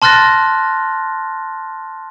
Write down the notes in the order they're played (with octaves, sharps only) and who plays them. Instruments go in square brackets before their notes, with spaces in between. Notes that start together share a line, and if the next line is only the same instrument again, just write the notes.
[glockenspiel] A5 C6 F6 F#6 A6 A#6